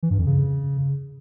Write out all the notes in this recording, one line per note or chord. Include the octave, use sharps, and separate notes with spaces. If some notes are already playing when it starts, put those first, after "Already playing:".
E3
G2
F2
C#3